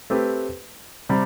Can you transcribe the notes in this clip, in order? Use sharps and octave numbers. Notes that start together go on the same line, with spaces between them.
A3 C4 G4 B4
C3 G3